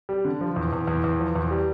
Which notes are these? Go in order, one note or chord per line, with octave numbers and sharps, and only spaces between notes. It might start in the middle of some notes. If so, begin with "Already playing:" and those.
G3
D3
F3
E2
E2
E2
E2
F3
E2
G3